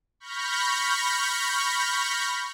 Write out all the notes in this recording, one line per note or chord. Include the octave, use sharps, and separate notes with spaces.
B5 C#6 F6 G6 A#6